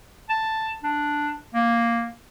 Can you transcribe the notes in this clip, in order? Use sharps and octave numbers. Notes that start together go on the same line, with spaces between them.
A5
D4
A#3